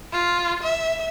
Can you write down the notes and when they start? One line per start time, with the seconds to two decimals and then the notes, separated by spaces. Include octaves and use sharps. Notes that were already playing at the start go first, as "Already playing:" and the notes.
0.13 F4
0.63 E5